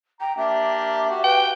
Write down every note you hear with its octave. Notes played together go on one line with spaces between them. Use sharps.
G5 A#5
A#3 D4 G4 E5
F#4 G4
B4 G5